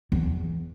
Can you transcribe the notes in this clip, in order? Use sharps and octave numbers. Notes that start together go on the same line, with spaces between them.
E2